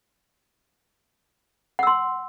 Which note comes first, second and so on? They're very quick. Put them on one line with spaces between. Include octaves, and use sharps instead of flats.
F#5 E6 C6